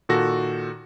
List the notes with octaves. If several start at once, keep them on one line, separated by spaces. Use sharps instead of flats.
A#2 D#3 F#4 A4 A#6